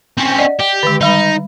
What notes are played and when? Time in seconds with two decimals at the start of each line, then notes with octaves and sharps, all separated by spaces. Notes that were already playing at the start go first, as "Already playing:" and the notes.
0.18 C4 C#4
0.39 D5 D#5 F#5
0.60 G4
0.83 D3 D#3 G#3
1.01 D#3 G3 D#4 B5